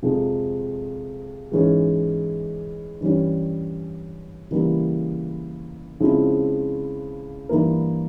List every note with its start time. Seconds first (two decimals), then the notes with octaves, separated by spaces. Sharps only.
0.02 F2 C3 F3 G#3
1.52 G#2 E3 G#3 C#4
3.01 G2 E3 G3 C#4
4.51 C#3 E3 G3 A#3 E4
6.00 C#3 F3 G#3 C4 E4
7.49 G2 E3 A#3 E4 A#4